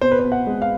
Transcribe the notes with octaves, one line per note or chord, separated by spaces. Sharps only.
B2 C5
B4
C5
B2
F#5
G#3
F5